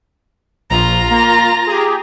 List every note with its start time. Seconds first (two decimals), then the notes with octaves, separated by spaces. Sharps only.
0.70 A#1 F4 A#5
1.10 A#3
1.67 G4 G#4